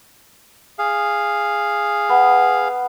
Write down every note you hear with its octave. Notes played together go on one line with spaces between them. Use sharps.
G#4 F5
B3